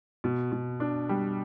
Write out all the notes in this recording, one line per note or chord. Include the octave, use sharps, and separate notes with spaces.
B2
B2
D4
G3